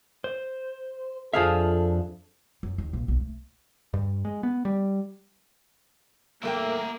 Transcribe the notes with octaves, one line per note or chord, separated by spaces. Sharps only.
C5
F2 F3 D4 G#4 A4 E5 F5
F#2
D#2
A#1
B1
A3
G2
G#3
B3
G3
E2 A3 A#3 A#4 E5 G5